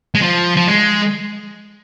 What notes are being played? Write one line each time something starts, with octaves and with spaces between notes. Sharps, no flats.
G#3
F3
F3
G#3